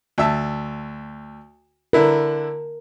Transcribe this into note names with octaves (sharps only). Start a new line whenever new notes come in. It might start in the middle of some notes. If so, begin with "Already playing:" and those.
D2 E5 A5
D3 E4 A#4 B4